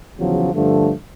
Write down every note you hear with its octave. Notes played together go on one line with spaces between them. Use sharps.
E2 C#3 F3 F#3
G2 D3 F3 A3